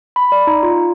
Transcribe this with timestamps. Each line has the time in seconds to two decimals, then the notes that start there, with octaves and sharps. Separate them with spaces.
0.16 B5
0.32 D5
0.47 D#4
0.63 F4